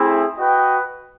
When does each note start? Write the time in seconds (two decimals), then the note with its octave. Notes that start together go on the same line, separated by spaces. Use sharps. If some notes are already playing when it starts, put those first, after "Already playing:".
Already playing: A3 C4 E4 G#4
0.38 F#4 B4 D#5 G5